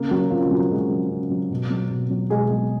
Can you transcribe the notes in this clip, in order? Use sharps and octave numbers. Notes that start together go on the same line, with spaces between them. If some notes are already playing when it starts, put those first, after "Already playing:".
Already playing: C#3 A#3 A#4
F#3 F#4
C#3 F3 F4
F4
F#3 F#4
C#3 G#3 G#4
F#3
C#3
F#3
B2
F#3
B2
F#3
B2 G#3 G#4
F#3